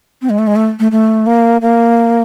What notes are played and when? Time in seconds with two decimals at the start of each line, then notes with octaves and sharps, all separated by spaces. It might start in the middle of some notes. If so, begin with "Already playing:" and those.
0.22 C4
0.30 G#3
0.39 A3
0.47 G#3
0.56 A3
0.80 A3
0.92 A3
1.27 A#3
1.61 A#3